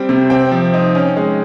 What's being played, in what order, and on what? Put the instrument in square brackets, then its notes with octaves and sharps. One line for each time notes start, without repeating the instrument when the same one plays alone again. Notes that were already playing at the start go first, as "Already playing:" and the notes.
Already playing: [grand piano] G3 C4 G5
C3
C4 G5
F3
D#4
C#4
G#3